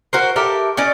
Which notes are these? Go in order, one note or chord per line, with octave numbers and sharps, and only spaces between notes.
F#4 A#4 C5
G4 A4 A#4 E5
C#4 D#4 D5